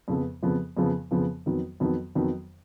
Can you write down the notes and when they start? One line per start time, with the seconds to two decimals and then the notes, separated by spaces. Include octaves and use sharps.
0.08 F2 C#3 F3 B3
0.42 F2 C#3 F3 B3
0.77 F2 C#3 F3 B3
1.11 F2 C#3 F3 B3
1.46 F2 D#3 F#3 B3
1.80 F2 D#3 F#3 B3
2.15 F2 D#3 F#3 B3